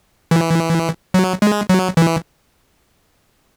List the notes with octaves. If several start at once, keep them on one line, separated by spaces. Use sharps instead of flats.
E3
F#3
G#3
F#3
E3